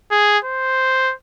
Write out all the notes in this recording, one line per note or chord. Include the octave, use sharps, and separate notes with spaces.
G#4
C5